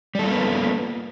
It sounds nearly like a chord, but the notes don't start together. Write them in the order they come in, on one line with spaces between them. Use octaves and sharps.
G3 A4 F4 A#3 B3